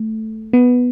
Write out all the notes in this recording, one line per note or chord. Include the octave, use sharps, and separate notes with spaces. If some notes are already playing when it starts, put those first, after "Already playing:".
Already playing: A3
B3